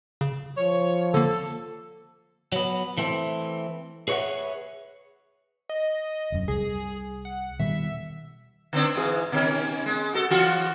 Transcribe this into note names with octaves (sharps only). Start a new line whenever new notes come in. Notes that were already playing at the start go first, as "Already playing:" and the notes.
C#3
F3 C#5
D3 A#3 A4
F#3 B3
E3 A3 C4
G#4 B4 C#5 D5 E5 F#5
D#5
E1 F#2
C2 G#4
F#5
B2 D#3 G3 E5
D3 C4 D4
G#2 E3 G#4
B2 D#3 C#4
G#3
F#4 A4
E3 F4 F#4